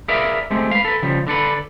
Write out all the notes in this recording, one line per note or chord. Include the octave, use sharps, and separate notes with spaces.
G#4 A#4 B4 D5 E5 F5
G#3 A3 C4 G4
B4 F5
A4 B4
C#3 F3 G3
D3 D4 A4 B4